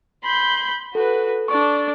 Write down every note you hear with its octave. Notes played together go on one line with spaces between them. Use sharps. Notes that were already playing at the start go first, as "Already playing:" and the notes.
B5 C6 G6
F#4 A4 B4
D4 A4 D5 C#6